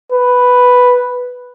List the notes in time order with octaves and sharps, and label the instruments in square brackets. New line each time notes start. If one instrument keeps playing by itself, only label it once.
[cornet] B4